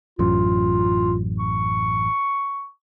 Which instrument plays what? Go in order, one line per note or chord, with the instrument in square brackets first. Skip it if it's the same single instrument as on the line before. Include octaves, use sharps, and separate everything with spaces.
[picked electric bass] A1 F#2 [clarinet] F4
[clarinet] C#6